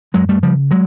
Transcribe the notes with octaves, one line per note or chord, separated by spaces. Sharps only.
F#2 F#3 G#3
G3 A3
C#3 F3 G3
F#3 G#3